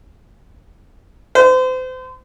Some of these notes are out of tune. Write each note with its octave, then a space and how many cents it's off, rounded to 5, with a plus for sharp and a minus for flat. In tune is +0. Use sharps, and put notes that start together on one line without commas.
C5 -35